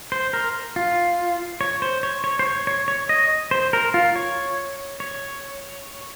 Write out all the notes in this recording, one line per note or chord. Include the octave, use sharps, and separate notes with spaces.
C5
A#4
F4
C#5
C5
C#5
C#5
C5
C#5
C#5
C#5
D#5
C5
A#4
F4
C#5
C#5